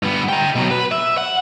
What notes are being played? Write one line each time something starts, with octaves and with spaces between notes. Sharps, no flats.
G2 B3
G5 A#5
B2 F#3
B4
E5
F#5